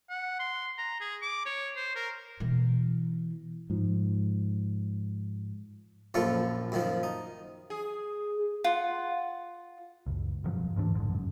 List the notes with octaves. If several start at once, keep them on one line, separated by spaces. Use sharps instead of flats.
F#5
C6
A#5
G#4
D6
C#5
C5
A#4
B2 E3
G#2 F3
A#1 F#2 F3 F4 A4 C#6
F#2 D#3 F3
D#4
G#4
F4 F#5
F#1 C#2
E1 G2 F3 F#3
D2 G#2 E3 D4
A#1 F2 G#2 D3
F#1 F#2